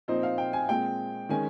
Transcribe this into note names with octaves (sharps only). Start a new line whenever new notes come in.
A#2 F3 C4 D#4 C5
F5
G5
G#5
A#2 G#3 C4 G5
D#3 G#3 C#4 G#5